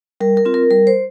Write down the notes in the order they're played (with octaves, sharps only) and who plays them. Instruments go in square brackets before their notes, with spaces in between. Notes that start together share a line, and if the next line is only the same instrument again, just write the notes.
[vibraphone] G3 A#4
A#4
C4 F4
A#4
G3 A#4
C5